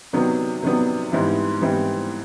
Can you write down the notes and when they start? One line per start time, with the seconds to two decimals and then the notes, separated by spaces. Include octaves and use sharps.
0.13 C3 D#3 F#3 B3 D4
0.62 C3 D#3 F#3 B3 D4
1.12 G#2 E3 G3 C4 E4
1.62 G#2 E3 G3 C4 E4